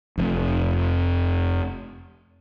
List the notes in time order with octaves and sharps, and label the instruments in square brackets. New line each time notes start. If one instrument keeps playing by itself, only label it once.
[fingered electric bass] F1 F2